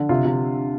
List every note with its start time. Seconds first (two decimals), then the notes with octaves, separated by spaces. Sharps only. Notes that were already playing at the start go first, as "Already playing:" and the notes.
Already playing: D3
0.09 C3 F4
0.25 C3